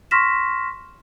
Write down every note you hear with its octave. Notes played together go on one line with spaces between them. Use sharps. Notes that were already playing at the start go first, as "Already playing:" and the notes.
C6 C#6 F6 A#6 B6 E7